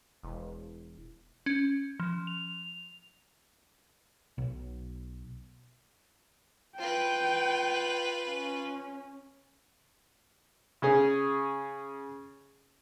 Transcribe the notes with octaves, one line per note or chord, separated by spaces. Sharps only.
E1
C#4
F3
F7
B1
F4 B4 G5
C#4
C#3 C#4 G#4